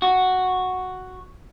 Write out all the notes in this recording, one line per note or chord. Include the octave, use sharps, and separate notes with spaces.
F#4